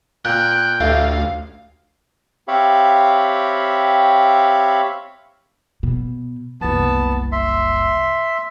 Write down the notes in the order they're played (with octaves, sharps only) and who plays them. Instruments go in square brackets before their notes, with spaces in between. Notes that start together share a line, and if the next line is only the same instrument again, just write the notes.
[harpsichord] A#2 [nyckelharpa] G5 [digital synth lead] F#6
[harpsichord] A1 A2 [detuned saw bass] D2 [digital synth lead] F5
[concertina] C4 G4 C#5 E5 F5 B5
[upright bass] B2
[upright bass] F#1 C2 [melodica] B3 A5
[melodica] E5 C6